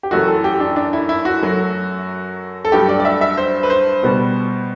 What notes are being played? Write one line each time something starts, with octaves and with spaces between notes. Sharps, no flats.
G4
F#2 E3 A3 F#4
A4
G4
D4
D4
E4
E4
F#4
F#2 F#3 A3
A4
G2 F#3 A3 G4
D5
D5
E5
E5
C5
B4
C5
B2 G3 B3